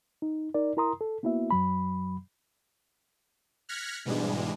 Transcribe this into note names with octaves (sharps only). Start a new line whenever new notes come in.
D#4
D#4 A#4 D5
E4 A#4 A#5 C6 D#6
A4
A#3 B3 E4 F#4 E5
F#2 F#3 B5
F6 F#6 G#6 A#6 B6 C#7
G#2 B2 E3 G3 G#3 D4